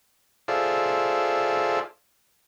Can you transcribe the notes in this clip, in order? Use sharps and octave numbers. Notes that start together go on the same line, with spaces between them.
F4 G#4 A4 C5 D5 E5